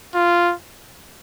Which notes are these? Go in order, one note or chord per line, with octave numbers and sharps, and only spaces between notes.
F4